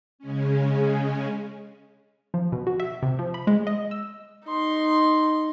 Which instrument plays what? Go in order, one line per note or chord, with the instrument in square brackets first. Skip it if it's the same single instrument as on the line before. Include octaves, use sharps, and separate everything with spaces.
[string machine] C#3 G#3 C#4
[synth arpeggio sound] F3
B2
F#4
E5
C3
F3
B5
G#3
D#5
E6
[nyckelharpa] D#4 C6